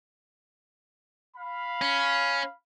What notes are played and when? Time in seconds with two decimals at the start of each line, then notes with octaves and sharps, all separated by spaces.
1.36 F5 B5
1.82 C#4